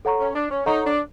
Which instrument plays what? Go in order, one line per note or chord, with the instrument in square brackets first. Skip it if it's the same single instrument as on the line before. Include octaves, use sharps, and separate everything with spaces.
[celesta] A4 C#5 F#5 A#5 C#6
[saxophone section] C#4
D4
C#4
[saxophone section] D#4 [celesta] A4 C#5 F#5 A#5 C#6
[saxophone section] D4